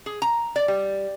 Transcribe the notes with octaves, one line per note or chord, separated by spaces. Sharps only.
G#4
A#5
D5
G3